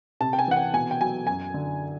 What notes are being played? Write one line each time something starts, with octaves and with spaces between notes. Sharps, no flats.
C3 A5
G5
G#5
E3 F#5
G5
B2 G#5
G5
F#3 G#5
F#2 G#5
D3